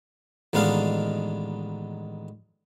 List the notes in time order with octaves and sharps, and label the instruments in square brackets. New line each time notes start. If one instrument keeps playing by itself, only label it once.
[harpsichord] A1 D#3 G#3 B3 D4 F5